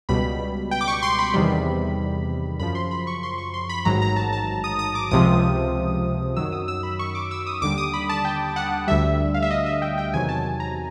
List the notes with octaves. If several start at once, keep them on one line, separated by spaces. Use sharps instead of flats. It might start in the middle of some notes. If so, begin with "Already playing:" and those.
C#2 B2 G3 B5
G5
D6
C#6
C6
B5
E2 C3 D#3 G3
F#2 C#3 F3 B5
C6
B5
C#6
C6
C#6
C6
B5
A1 G#2 D#3 F#3 A#5
A#5
A5
A5
D#6
D#6
D6
C#2 C3 F3 D#6
F#2 D#3 F#3 E6
D#6
E6
B5
C#6
D6
E6
D#6
D#2 D3 G3 D6
D#6
B5
A5
G5
F#5
D2 D3 G3 E5
F5
E5
D#5
E5
G5
G5
E2 C3 D#3 F#3 G#5
A5
A5
A#5